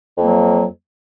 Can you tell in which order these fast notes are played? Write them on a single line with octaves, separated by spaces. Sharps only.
F2 A#3 F#3